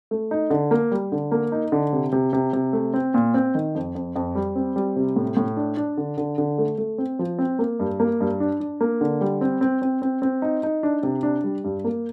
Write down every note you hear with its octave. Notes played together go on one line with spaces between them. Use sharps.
A3
D#4
D3
A#3
G3
D3
A#3
D#4
D3
C3
C3
C3
C3
A3
C4
A#2
C4
D#3
F2
F2
F2
G3
C4
G3
C3
A2
A2
D4
D4
D3
D3
D3
A3
A3
C4
F3
C4
A#3
G2
A#3
G2
D4
D4
A#3
D3
G3
C4
C4
C4
C4
C4
D#4
D#4
D4
C3
D4
G3
G2
A#3